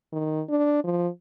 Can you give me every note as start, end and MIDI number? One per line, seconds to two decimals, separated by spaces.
0.12 0.41 51
0.49 0.84 62
0.84 1.08 53